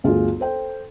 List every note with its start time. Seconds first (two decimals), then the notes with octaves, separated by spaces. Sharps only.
0.04 G1 D2 F4 G#4
0.40 A4 C5 G5